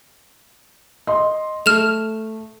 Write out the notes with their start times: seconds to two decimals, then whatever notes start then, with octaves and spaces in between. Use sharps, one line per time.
1.07 D#5 C6
1.66 A3 F6 E7 F7